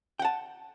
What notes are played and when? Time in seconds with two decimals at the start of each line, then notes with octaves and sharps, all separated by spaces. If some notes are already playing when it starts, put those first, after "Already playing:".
0.19 G5
0.22 F#5
0.25 A5